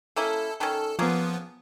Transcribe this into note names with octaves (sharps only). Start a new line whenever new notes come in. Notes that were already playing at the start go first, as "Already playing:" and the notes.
A#3 C#4 E4 A4
D#3 C#4 A4
F3 A#3 B3 C#4 G#4